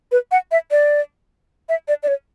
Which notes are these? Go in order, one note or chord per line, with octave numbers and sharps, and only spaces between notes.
B4
F#5
E5
D5
E5
D5
D5
C#5